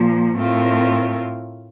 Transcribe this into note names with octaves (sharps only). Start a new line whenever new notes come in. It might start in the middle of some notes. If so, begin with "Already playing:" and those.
Already playing: A#2 F3 A#3
A2 A3 C4 F4 A#4